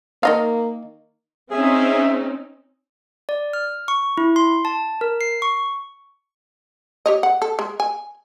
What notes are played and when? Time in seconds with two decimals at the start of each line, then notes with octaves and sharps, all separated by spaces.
0.23 D#3 A#3 D#5 F5
1.51 C4 C#4 D#4 G#4 E5
3.29 D5
3.53 F6
3.88 C#6
4.18 E4
4.36 C6
4.65 A5
5.01 A#4
5.21 C7
5.42 C#6
7.06 G4 C#5 D#5
7.23 F#5
7.42 A4
7.59 G#3
7.80 G#5